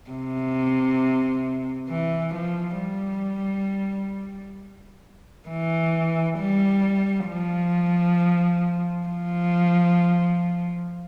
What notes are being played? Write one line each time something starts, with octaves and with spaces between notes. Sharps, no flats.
C3
E3
F3
G3
E3
G3
F3
F3